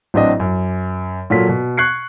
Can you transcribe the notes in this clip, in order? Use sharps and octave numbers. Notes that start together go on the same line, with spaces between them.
A1 F#3 C4 D4 F#4 D#5
F#2
A#2 F#3 F4 A4 B6
B2
C#6 F#6 G#6 C7 C#7